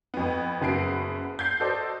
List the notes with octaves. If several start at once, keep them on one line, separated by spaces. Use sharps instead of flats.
F2 B3
F#1 C#3 B3 F#4 C7 D7
G6 G#6 C7
F#4 A4 C5 D5 D#5